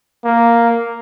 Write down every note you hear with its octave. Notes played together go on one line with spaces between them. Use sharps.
A#3